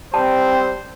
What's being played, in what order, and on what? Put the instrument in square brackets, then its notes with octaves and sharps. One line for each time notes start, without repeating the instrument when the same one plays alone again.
[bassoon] G3 [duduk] C4 [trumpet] C5 [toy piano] A5